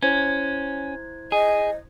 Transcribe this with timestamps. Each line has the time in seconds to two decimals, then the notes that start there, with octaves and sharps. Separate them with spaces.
0.03 C#4 E4 C5 G#6
1.32 G#4 D#5